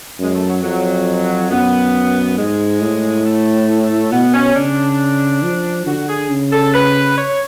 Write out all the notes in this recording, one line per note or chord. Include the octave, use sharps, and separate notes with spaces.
F#2 G#3
A3
F#3
F2 F#3
F#2 B3
G#2 G#3
A2
A3
B2 B3
C#4
C#3 D4
F3
D3 F#4
G#4
C#3
A4
B4
C#5